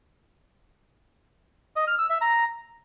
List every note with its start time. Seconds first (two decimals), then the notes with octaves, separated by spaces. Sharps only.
1.76 D#5
1.87 F6
1.99 E6
2.10 E5
2.21 A#5